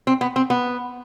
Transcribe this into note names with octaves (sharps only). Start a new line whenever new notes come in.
C4
B3
C4
B3